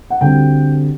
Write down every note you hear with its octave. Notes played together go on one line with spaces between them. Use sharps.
F#5
D2 D3 G3 C4 G5